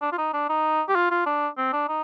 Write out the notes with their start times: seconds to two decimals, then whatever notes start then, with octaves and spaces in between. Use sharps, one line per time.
0.02 D4
0.12 F4
0.18 D#4
0.33 D4
0.49 D#4
0.88 G4
0.95 F4
1.11 F4
1.26 D4
1.57 C4
1.73 D4
1.88 D#4